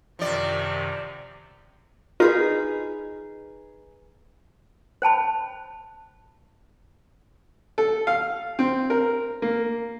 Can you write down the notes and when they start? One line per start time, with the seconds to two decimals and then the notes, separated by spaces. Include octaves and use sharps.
0.19 F#2 C3 D#3 F3 D5
2.20 D#4 F4 G#4 A#4 B4
5.02 C5 G5 A5 B5
7.78 A4
8.07 F5
8.59 C4
8.90 A#4
9.42 A#3